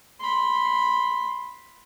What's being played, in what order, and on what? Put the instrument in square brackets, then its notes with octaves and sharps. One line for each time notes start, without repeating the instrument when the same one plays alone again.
[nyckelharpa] B5 C6